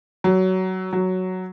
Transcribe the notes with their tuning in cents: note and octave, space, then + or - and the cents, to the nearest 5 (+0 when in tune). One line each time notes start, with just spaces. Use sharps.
F#3 +20
F#3 +5